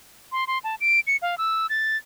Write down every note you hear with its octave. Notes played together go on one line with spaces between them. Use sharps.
C6
C6
A5
D7
C#7
F5
E6
A6